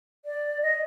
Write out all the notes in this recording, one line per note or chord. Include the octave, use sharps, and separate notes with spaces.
D5
D#5